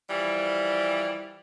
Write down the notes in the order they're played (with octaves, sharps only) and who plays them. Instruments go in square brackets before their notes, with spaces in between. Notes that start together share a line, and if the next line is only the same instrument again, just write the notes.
[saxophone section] E3 F3 G3